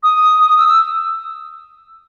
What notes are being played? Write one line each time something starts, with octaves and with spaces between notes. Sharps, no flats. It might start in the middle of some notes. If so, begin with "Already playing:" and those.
D#6
D#6
E6
E6